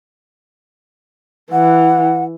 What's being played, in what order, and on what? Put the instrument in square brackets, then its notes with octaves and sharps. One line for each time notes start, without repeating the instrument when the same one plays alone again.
[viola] E3 [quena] F#5